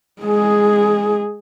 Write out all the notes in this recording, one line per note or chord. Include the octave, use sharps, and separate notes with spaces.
G#3 G#4